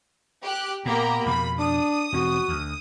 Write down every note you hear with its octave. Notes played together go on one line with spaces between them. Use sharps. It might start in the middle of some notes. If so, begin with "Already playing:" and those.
G4 F#6
A#2 A#3 B3 G4 A#5
F2 B2 B5
D4 D#6
E1 C4 F#4
D2